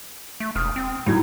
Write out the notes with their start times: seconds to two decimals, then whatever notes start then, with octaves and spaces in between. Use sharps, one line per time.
0.40 A3
0.56 E1 D#6 F6
0.76 C4
1.06 A2 F#3 D#4 G#6